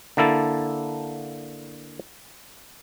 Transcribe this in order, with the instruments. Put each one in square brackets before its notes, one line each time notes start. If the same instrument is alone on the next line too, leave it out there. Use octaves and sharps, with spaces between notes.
[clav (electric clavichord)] D3 A#3 E4 A4